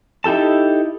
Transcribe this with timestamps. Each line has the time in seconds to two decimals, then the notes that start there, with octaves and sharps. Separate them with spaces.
0.24 D#4 E4 G4 A4 A5